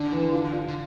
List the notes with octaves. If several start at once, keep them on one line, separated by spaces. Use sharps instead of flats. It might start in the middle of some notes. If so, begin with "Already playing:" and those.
Already playing: D3 D4
E3
F4
F4
D3